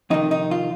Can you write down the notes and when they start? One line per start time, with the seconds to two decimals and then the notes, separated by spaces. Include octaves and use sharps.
0.10 F2 C3 D#3 D#4
0.31 D#4
0.51 F4